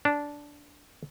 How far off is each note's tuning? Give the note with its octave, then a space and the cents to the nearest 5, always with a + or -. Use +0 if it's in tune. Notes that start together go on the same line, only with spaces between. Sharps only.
D4 -10